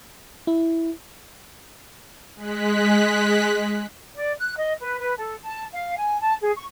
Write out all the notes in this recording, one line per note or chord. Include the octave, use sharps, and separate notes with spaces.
E4
G#3 F#6 B6
D5
F#6
D#5
B4
B4
A4
A5
F5
G#5
A5
G#4
C#6